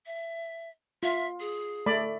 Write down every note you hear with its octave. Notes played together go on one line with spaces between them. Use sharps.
E5
F4 E5
G#4
A3 D5 B5